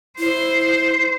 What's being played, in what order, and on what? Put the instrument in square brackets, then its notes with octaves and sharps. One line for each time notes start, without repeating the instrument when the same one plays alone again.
[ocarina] E4 [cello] C5